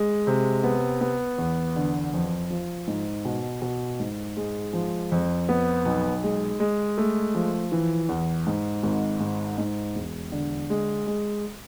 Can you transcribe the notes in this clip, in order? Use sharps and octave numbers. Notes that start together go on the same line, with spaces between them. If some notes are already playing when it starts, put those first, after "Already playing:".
Already playing: G#3
C3
B3
B3
E2
D3
F2
F3
G#2
B2
B2
G#2
G#3
F3
F2
B3
B1
G#3
G#3
A3
F3
E3
E2
G#2
G#1
G#2
G#2
E1
D3
G#3
G#3